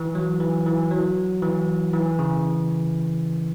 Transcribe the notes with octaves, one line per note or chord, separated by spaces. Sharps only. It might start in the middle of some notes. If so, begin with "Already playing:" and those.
Already playing: E3
F#3
E3
E3
F#3
E3
E3
C#3